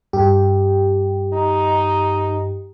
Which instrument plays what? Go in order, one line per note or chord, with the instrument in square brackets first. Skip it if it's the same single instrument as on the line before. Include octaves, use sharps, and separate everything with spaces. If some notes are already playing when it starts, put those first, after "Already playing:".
[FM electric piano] G2 G4
[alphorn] D#4